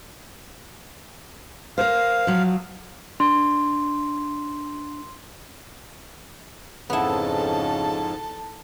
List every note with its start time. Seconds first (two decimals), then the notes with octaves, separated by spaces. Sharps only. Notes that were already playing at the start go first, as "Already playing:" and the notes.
1.78 A#4 C5 F5
2.27 F3 F#3
3.20 D4 C6
6.90 F2 G#2 C#3 B3 E4 A4 A5